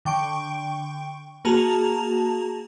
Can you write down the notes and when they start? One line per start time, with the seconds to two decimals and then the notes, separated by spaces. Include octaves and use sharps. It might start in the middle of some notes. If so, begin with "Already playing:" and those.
0.05 D3 G5 C#6 D7
1.45 A#3 F#4 G#4 A5 A#5 F7